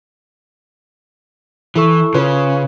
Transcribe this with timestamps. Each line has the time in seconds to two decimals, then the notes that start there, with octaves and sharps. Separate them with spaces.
1.76 E3 E4 A4 C#6
2.14 C#3 F4 B4 C#5